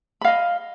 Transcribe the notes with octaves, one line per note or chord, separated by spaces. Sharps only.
D#5 F5 B5